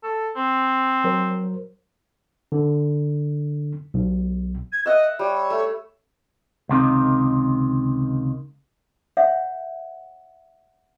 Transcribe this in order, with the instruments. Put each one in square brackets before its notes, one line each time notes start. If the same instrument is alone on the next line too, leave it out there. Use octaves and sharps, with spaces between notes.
[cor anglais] A4
C4
[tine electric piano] F#3 A#4 C5
D3
B1
[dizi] G#6
[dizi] D#5 [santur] E5 F#5
[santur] G3 [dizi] C#5
[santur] A3
[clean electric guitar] C#2 C3 D#3
[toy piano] C#5 E5 F#5